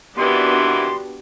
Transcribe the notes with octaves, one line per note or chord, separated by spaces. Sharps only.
C3 D#3 E3 B3 D4 F#4 G4 C6